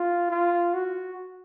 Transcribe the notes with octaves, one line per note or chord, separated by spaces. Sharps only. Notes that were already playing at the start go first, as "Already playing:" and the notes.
Already playing: F4
F4
F#4